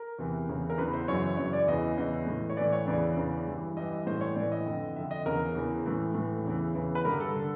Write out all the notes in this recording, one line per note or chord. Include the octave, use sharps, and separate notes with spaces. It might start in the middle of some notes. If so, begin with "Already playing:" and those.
Already playing: A#4
E2 C3 E3
E2 C#3 E3
A#4
E2 C#3 E3 B4
C5
F#2 C#3 E3 C#5
F#2 C#3 E3 C#5
D5
E2 C#3 E3 D#5
E2 C#3 E3 D#5
A2 E3
C#5
A2 E3 D5
C#5
E2 C#3 E3 D5
E2 C#3 E3
G2 E3
G2 E3 D#5
A2 E3 C5
C#5
A2 E3 D5
D#5
F2 D3
F2 D3 E5
D#5
E2 C#3 E3 A#4
E2 C#3 E3
A2 E3
A2 E3
E2 C#3 E3
E2 C#3 E3
B4
G2 D3 A#4
A4
D3